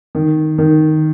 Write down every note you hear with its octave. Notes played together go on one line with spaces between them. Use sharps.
D#3
D#3